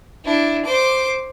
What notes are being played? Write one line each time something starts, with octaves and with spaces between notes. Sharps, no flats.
D4 E4
C5 D6